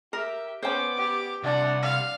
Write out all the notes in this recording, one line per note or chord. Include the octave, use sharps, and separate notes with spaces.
G4 A#4 E5
B3 C#4 C5 G5 D6
G4
C2 D4 F#5
F5